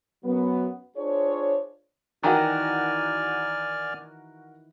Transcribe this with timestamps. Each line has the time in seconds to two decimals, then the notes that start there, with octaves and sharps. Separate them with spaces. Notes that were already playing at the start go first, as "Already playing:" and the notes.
0.25 F#2 F#3 B3
0.97 D4 F4 G#4 C5 C#5
2.23 D#3 E3 F#4 A#4 D5 G#5 F6